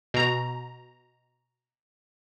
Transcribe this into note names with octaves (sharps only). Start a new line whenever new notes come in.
B2 A#5